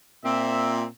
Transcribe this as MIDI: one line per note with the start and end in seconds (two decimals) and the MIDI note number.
0.24 0.84 46
0.24 0.84 60
0.24 0.84 76